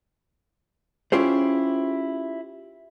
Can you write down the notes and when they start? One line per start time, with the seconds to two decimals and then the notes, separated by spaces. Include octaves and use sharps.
1.12 C#4 E4 F4 G4 G#4 C5